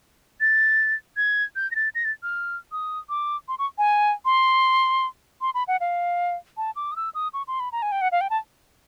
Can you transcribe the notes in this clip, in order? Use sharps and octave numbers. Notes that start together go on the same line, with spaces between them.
A6
G#6
G6
A#6
A6
A#6
A6
F6
D#6
D6
C6
C#6
G#5
C6
C6
B5
F#5
F5
A5
D6
D#6
E6
D#6
C#6
C6
B5
A#5
G#5
G5
F#5
F5
G5
A5